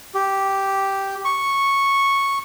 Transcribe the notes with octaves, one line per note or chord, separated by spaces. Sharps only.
G4
C#6